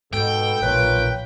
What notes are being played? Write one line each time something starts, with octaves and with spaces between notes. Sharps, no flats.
G#2 B2 A4 G5
A#1 B2 F4 A#4 B4 C#5